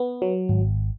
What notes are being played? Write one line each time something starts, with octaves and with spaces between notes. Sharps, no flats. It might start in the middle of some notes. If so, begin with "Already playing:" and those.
Already playing: B3
F#3
G#1